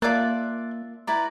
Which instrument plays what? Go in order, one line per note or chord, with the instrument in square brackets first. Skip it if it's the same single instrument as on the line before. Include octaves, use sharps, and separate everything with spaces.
[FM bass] A#3 [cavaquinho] F4 E5 A5 [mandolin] D5 F#6
[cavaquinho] E4 B4 D5 [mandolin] A#5